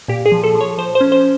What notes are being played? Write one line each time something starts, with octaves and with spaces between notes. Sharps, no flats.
A#2 G4
G#4
F3
A4
F3
C#5
F3 C5
C5
C#4
C5